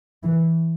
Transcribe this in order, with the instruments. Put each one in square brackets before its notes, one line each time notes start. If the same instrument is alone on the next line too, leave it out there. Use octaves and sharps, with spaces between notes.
[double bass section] E3